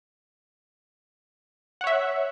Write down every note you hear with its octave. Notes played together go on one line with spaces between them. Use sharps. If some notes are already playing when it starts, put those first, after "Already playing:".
C#5 E5 F#5